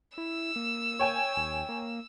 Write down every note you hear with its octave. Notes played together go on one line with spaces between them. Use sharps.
E4 E6
A#3
C#5 G5 G#5
D#2
A#3